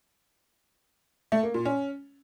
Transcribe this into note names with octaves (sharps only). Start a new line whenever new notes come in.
A3
A#3
A#2
C#4